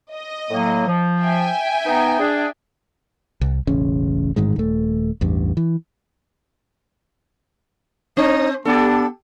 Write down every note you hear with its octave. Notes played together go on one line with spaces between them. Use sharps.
D#5
A2 F#3 A#3
F3
E5 G5 G#5
B3 D#4
D4 G#4
C2
E1 A1 C#3 C#4
A1 G#2 D#3 G#3
D#1 A3
A1 E2 G2
E3
C4 D#4
B3 D4 G4 A4